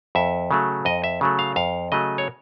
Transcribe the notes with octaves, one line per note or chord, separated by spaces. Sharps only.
F2 E5
C#3 F#3 A3
F2 D#5
E5
C#3 F#3 A3
F5
F2 F5
C#3 F#3 A3 D#5
C#5